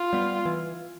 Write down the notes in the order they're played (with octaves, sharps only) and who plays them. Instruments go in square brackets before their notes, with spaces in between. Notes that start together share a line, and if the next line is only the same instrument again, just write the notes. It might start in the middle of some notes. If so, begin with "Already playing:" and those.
Already playing: [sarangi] F4
[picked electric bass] G3 B3
E3